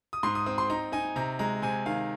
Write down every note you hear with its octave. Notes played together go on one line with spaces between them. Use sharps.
D#6
G#2 C6
D#6
C4 D#6
C6
D#4 A#5
D#4 G#5
C3 A#5
G#3 A#5
C3 G#5
D#3 F5